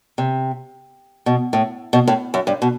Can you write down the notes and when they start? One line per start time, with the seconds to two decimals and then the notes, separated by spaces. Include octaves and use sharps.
0.18 C3
1.26 B2
1.53 A2
1.93 B2
2.08 A2
2.34 F#2
2.47 G2
2.62 B2